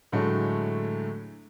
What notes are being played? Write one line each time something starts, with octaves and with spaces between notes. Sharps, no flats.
A2 D3 F#3 G#3 A3